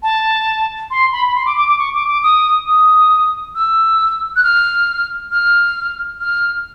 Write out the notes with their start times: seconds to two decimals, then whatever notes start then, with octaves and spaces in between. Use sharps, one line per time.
0.03 A5
0.91 C6
1.13 B5
1.26 B5
1.35 C6
1.46 D6
1.57 D6
1.68 D6
1.79 C#6
1.94 D6
2.08 D6
2.23 D#6
2.67 D#6
3.55 E6
4.36 F#6
4.43 F6
5.31 F6
6.20 F6